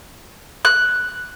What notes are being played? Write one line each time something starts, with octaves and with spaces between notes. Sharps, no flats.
F#6